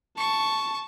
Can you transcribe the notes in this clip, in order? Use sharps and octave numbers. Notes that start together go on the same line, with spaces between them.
A5 C#6